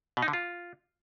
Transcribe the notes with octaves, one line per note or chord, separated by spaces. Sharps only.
B2
D#4
D3
F4